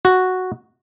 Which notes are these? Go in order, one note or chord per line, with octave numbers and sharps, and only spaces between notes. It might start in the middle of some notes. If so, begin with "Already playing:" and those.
F#4